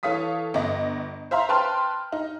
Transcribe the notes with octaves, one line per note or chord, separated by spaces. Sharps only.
E3 A4 C#5 F5 D#6 B6
G1 D#5
C5 E5 F5 A#5 C6
B4 G5 A5 C6 F6
D#4